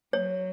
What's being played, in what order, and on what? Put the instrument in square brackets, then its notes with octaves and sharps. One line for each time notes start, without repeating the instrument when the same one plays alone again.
[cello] F#3 [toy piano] C#5